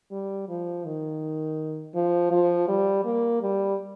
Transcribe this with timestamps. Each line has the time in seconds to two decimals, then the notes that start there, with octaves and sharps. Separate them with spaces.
0.11 G3
0.48 F3
0.84 D#3
1.95 F3
2.31 F3
2.68 G3
3.05 A#3
3.42 G3